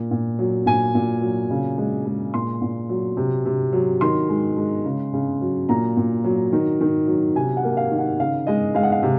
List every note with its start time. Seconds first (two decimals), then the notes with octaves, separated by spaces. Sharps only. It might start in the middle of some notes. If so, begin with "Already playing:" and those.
Already playing: A#2
0.11 A#2
0.39 F#3
0.66 A#2 G#5
0.95 A#2
1.22 F#3
1.50 C#3
1.78 G#3
2.06 G#3
2.34 A#2 C6
2.62 A#2
2.89 F#3
3.17 C3
3.46 C3
3.73 F#3
4.01 D#3 C6
4.29 G#3
4.57 G#3
4.85 C#3
5.13 C#3
5.41 F#3
5.69 A#2 A#5
5.97 A#2
6.24 F#3
6.52 D#3
6.81 D#3
7.07 F#3
7.35 C3 G#5
7.57 F#5
7.63 A#3
7.77 F5
7.91 D#3
7.98 F#5
8.20 C#3 F5
8.47 G#3 D#5
8.75 G#3 F5
8.83 F#5
8.92 F5
9.03 C3